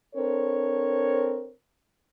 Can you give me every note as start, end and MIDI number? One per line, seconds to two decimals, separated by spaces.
0.15 1.51 60
0.15 1.51 62
0.15 1.51 69
0.15 1.51 70
0.15 1.51 72
0.15 1.51 73